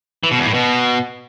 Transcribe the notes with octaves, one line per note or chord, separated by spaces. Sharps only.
E3
B2
E2
A2
B2